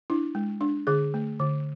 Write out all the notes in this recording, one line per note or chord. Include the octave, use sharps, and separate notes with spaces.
D4 E4
G#3
D4
D3 G#4
A3
D3